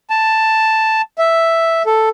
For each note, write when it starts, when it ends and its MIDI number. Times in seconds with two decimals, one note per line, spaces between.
0.10 1.02 81
1.18 1.83 76
1.86 2.09 69